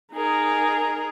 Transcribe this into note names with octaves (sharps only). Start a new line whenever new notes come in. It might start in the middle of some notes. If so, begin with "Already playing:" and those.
D#4 G#4 A#4